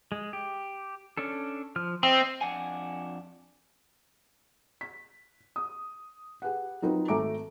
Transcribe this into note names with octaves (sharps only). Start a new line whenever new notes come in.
G#3
G4
C#4 D4 A4
F3 F6
C4 D#5 E5
F2 D4 F#5 G#5
B6
D#6
G4 G#4 B4 F#5
F#3 C4 D#4 F4 A#4 B4
G#1 A3 G#5 A#5 D6 D7